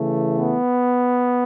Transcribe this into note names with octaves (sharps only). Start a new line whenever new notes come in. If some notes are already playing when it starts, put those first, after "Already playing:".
Already playing: C#3 E3 A3
B3